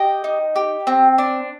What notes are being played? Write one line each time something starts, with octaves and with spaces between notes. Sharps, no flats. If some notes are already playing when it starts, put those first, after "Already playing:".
Already playing: G4 D#5 G5
D#4
G4
C4
D4